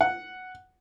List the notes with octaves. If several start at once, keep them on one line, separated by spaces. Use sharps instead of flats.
F#5